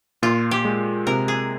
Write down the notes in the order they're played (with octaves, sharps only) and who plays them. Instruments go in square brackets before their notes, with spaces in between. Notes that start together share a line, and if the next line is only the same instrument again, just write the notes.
[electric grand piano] A#2 [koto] F4
[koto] G4
[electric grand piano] G#3
[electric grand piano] C3 [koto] A#4
[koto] G#4